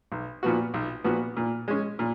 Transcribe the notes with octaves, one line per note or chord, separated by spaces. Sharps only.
B1
A#2 F3 B3 F#4
B1
A#2 F3 B3 F#4
A#2
G#3 C#4
A#2